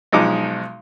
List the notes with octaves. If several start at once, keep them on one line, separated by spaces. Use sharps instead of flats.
B1 F3 G#3 D#4 D6